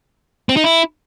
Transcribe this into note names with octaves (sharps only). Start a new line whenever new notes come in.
C4
D#4
E4